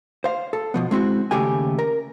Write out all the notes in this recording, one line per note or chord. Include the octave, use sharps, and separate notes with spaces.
C5 F5
A4
B2 F3 B3
G#3 C4 E4 F#4
D#2 C#3 A3 G4 G#5
A#4